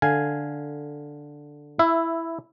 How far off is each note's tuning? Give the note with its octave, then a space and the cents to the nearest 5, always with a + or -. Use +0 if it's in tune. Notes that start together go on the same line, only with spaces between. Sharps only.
D3 +0 F5 +0 G#5 +0
E4 +0 E5 +15